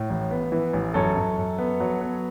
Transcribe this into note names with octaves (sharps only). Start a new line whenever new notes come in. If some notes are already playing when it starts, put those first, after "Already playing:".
Already playing: A2
A1
B3
E3
A1
F#2 A4 C#5
F#2
F#2
B3
F#3
B3